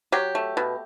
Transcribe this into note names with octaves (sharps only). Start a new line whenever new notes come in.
F#3 G4
A3
B2